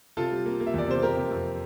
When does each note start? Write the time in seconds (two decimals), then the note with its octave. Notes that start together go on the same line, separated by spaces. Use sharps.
0.17 C3 F4 A4
0.31 G3
0.46 A#3
0.60 A#3
0.67 E5
0.74 E2 D5
0.88 C3 C5
1.02 F2 G4 A#4
1.16 C3
1.31 F2